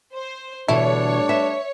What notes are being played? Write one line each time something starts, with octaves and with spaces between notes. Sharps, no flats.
C5
B2 D3 E3 G3 A3 D4 E4 C#5
B4 E5